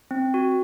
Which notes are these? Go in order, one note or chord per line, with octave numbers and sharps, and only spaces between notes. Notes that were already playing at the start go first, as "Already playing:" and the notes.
C4
F#4